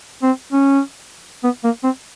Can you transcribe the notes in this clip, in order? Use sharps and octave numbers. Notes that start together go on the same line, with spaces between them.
C4
C#4
B3
A#3
C4